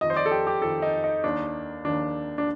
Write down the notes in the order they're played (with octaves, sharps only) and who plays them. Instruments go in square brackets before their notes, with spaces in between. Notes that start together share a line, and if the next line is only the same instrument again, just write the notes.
[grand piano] F2 D#3 D#5
C5
D5
A4
G4
G4
F2 D#3 A4
D#4
D#4
D#2 D#3 D4
D#2 D#3 D4
D4